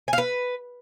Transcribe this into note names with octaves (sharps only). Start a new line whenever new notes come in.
G#5
F5
B4